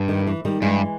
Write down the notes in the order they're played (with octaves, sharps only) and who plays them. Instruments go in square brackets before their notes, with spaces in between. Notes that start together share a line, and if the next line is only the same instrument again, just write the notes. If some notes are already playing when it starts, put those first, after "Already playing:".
Already playing: [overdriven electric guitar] G2
[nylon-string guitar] D#3
E3
D#3 G3
[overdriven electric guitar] G2 [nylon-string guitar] E3 G#3